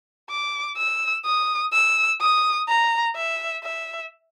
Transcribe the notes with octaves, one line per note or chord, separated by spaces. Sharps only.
D6
E6
D#6
E6
D#6
A#5
E5
E5